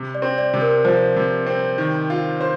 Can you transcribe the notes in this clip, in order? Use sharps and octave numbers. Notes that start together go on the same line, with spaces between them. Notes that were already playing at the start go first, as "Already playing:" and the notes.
Already playing: C3
D5
C4
D5
C3
A#4
F3 C5
C3
C4
D#3
F4
C5